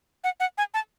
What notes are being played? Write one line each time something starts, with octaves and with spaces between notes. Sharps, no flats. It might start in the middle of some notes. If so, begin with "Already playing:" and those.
F#5
F#5
G#5
A5